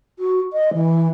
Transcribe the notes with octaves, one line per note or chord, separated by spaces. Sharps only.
F#4
D#5
E3